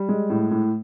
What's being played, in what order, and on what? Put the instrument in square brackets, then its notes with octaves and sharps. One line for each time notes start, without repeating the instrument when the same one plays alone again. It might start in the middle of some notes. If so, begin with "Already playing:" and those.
Already playing: [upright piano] G3
G#3
A2
A2